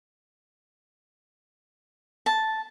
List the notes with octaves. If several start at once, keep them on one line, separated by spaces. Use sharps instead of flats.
A5